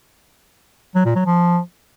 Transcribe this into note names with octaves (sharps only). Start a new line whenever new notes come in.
F#3
A#2
F#3
F3